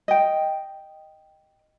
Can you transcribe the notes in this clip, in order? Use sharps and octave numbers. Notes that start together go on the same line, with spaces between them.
D#5 G5